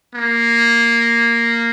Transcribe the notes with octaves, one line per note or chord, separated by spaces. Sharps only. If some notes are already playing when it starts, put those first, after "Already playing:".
A#3